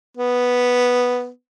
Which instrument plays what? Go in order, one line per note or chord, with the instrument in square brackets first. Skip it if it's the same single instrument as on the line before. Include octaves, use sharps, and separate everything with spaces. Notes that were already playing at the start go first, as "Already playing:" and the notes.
[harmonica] B3